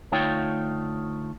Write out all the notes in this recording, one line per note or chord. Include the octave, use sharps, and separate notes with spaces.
D2 A3 D#4 F4 C#5 G5